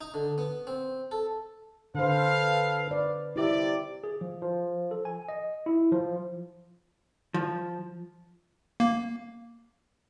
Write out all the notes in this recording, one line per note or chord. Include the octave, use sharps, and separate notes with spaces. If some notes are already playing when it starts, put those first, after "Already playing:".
D#4
D3
B3
C4
A4
D3 A4 B4 C5 F5
B4 D5
C3 E4 G4 D5 E5
G#4
F3
F3
A4
G#5
D#5
E4
F3
F3
A#3